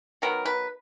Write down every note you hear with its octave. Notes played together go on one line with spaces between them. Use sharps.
D#3 F#3 B3 A#4
B4